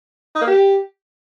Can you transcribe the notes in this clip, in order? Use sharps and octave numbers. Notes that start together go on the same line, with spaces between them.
D#4
A#3
G4